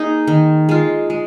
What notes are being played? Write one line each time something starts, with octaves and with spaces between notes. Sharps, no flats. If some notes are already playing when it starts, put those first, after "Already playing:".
Already playing: A#3 D#4 G#4
D#3
G#3 F4
G#3